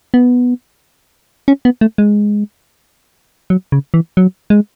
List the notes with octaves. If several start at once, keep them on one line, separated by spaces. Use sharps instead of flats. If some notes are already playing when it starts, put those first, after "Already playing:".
B3
C#4
B3
A3
G#3
F#3
C#3
E3
F#3
G#3